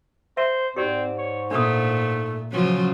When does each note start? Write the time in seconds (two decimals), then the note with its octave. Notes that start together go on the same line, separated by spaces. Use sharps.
0.37 C5 E5
0.76 G#2 C4 G4 D5
1.18 C#5
1.51 A#2 A3 D4 D#6
2.52 C#3 F3 F#3 C#4